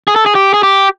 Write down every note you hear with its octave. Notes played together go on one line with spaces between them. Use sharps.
G#4
A4
G#4
G4
G#4
G4